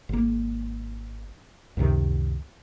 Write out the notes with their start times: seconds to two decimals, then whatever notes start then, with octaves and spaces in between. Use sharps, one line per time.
0.09 G#1 A#3
1.77 C#2 F#2 C3 D#3